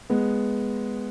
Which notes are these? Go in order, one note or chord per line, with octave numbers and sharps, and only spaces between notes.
G#3 B3